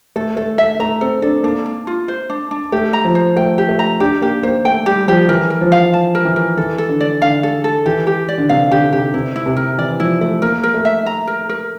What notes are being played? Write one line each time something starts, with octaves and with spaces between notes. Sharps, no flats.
A3 A4
A3 A4
A3 E5
A3 A#5
C4 A4
D4 A4
A#3 D4
D4
F4
C5
D4
D4
A3 G4
A#5
F3
C5
A3 G5
G4
A3
A#5
D4 G4
A#3 G4
A#3 C5
A3 G5
G3 G4
F3 G4
E3 A#4
A#4
F3
F5
A5
A#4
E3
A#4
E3 A4
A4
D3
D5
D3 F5
A4
A4
E3 G4
G4
D5
D3
C3 F5
D3 G4
C3 G4
C3 E4
E4
C3
A#4
E3 D5
F3 E4
A3 E4
A#3 A#4
A#4
A3
E5
A#5
A#4
A#4